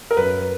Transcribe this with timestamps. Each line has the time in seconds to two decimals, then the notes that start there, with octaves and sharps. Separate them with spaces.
0.11 A#4
0.17 F#2 B4